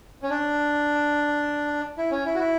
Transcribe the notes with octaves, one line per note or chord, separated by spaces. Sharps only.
C#4
D4
E4
C#4
E4
F#4
E4